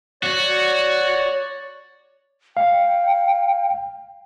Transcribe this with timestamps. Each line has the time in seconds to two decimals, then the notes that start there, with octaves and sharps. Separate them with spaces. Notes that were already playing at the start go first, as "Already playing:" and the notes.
0.23 F#4 C#5 D5
2.57 F5 G5